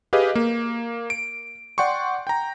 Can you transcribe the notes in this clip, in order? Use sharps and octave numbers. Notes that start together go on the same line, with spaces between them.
G4 G#4 B4 D#5 F5
A#3
D7
D5 F#5 G5 C6 C#6
G5 A#5